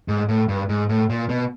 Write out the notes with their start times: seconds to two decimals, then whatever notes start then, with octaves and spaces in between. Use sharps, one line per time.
0.08 G#2
0.29 A2
0.48 G2
0.69 G#2
0.89 A2
1.10 A#2
1.29 B2